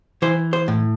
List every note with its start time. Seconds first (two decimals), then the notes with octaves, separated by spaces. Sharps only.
0.22 E3 C5
0.53 C5
0.68 A2